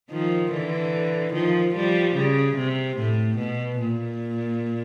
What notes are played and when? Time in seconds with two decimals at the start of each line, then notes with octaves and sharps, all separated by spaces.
0.11 D#3 F3
0.52 D3 E3
1.33 D#3 F3
1.75 F3 G3
2.16 C#3
2.57 C3
2.98 A2
3.38 B2
3.79 A#2